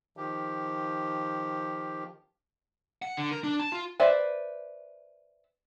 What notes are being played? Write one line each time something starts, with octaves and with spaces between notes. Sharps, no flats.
D#3 F3 G4
F#5
D3
A#4
D4
A5
F4
B4 C5 D5 E5